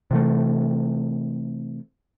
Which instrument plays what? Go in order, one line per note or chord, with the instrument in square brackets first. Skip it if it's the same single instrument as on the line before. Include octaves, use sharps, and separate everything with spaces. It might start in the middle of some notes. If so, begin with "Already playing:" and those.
[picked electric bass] C3 E3 A3